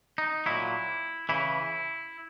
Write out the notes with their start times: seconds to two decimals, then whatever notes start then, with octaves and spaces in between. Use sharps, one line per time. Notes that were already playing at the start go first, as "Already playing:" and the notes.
0.18 D#4
0.46 A#2 F#3 E4
1.29 C#3 E3 E4